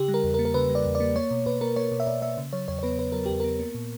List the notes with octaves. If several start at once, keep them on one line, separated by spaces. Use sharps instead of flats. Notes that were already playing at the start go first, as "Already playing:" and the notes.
Already playing: C#3 G4
G3
A#4
E2
A#4
A#3
A#4
C#3 B4
G3
D5
E2
D5
A#3
A#3 C#5
B2
B2 B4
A#3 A#4
A#3 C#5
B2
E5
B2 D5
A#3 E5
C#3
F#3 C#5
E2 C#5
C#5
B3 B4
C#3 B4
F#3 A#4
E2 G4
B3 A#4
A#3
A#2